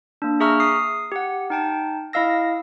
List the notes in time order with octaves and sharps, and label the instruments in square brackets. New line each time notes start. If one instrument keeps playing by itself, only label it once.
[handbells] A#3 D4
G#4 E5 A#5 C#6 E6 F6
D#6 C7
G4 F#5
D#4 G5 A5
E4 D#5 F5 E6 A#6